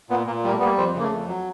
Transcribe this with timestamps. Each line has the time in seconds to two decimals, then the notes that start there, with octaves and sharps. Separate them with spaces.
0.10 A#2 B3
0.27 A#2 A#3
0.44 G3 A#3
0.52 A3
0.59 G3 B3
0.65 A#3
0.77 F2 C4
0.94 C#3 A#3
1.03 A3
1.12 F2
1.28 F#3